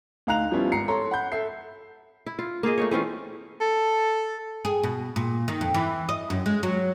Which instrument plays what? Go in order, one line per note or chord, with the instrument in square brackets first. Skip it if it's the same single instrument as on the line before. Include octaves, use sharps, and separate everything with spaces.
[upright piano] D2 D#4 F5 A#5 F#6 F7
F3 G3 B3 C#4 E4 F4
G#1 A#5 C7 C#7
A4 C#5 A#5 C6
F#5 B5 G6
A4 E5 C7
[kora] E4
F4
A#3 F4 G#4 D#5
A3 D#4 C#5
E3 C4 C#4 F4
[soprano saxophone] A4
[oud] G#4
B2
A#2
D#3
F2
E3
D#5
F#2
G#3
F#3